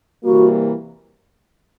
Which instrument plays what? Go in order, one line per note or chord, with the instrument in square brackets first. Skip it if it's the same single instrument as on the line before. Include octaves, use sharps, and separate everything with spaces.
[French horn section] C3 E3 G3 A#3 [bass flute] F#4